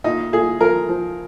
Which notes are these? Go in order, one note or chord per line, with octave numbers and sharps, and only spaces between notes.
A#2 D#4
A#2 G#4
F3 A#4
F3